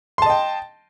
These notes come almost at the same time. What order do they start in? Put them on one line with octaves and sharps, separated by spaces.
C6 A5 D#5 G5